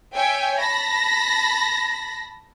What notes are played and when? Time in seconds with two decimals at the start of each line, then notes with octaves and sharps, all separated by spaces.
0.14 C#5 E5 G5 G#5
0.57 A5 B5 A#6